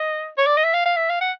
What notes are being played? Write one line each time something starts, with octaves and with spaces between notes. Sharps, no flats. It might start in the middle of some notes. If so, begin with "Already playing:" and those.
Already playing: D#5
C#5
D5
D#5
E5
F5
F5
E5
F5
F#5